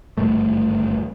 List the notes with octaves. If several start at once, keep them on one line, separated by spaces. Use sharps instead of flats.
G#1 D2 G2 A3